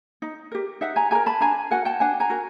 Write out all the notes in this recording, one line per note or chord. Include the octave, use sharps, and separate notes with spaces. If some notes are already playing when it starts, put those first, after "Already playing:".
D#4
G4 A#4
D#4 E5 F#5
G#5 A#5
G4 A#4 G#5 A#5
A5 B5
D4 G#5 A#5
F#4 A#4 F#5 G#5
G5 A5
D4 F#5 G#5
G#5 A#5
F#4 A#4